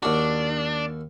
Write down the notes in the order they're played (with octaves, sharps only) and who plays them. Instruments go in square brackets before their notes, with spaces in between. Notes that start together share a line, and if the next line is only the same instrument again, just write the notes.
[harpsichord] D#2 F#4 [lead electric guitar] D4